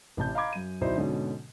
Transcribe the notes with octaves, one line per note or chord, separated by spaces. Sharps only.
A1 C3 A5 G6
D#5 F5 A#5 B5 D6 G#6
F#2 D#7
D1 B1 D#4 E4 C5 D5
G#2 B2 D3 C#4